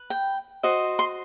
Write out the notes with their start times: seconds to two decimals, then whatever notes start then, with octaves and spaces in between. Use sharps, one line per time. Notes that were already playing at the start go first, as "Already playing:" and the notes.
Already playing: B4
0.10 G5
0.63 F#4 C5 D#5
0.99 C6